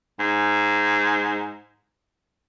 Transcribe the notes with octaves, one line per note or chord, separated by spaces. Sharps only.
G#2